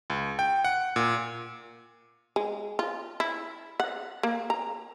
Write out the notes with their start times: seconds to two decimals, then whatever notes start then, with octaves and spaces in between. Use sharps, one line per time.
0.10 C#2
0.39 G5
0.64 F#5
0.96 A#2
2.36 G#3
2.79 F4
3.20 E4
3.80 F#5
4.23 A#3
4.50 A#5